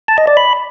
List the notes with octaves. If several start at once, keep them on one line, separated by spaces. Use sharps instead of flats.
A5
D#5
D5
B5